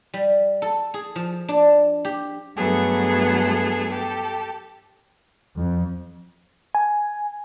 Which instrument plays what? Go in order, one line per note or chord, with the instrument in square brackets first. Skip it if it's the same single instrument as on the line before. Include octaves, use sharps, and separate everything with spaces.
[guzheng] G3
A4
G#4
F3
D4
G4
[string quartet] G2 F#3 A3 B3 G#4 A4
G4 A4
[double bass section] F2
[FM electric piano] G#5